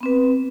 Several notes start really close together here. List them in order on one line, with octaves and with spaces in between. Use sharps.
B3 C4 B4